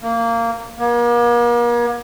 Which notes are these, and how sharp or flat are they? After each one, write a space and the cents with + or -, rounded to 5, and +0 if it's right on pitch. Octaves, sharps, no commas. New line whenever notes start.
A#3 -15
A#3 +40